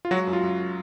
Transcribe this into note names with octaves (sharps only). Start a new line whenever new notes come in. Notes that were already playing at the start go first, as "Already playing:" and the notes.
F4
F#3 G#3 F#4
F#2
F4
F#2